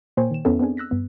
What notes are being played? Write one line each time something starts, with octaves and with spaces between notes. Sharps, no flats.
A#2 A#3 C5 C#5 G5 G#5
D#3 E7
F2 B3 C#4 E4 A4 E5
B3 C4 D4 G#4
E6 F#6 A#6 B6
G2 B3